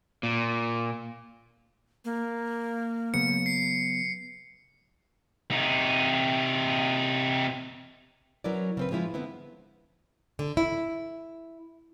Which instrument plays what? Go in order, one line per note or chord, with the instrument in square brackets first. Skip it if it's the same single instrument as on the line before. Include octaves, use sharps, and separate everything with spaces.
[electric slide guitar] A#2
[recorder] A#3
[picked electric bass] C#3 F#3 B3 [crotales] C#7
[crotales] C7
[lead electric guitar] C3 D#4
[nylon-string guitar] F#3 C#4 E4 A#4 B4 D5
C#3 C4 B4
F3 G#3 C#4 E4 F4
D3 B3 C4 E4
D3
E4